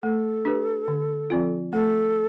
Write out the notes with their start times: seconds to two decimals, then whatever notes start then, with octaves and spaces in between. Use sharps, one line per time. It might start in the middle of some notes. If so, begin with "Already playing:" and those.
0.03 A3 A4
0.45 D4 G4 B4
0.88 D3
1.30 F3 C4 F4
1.73 A3 A4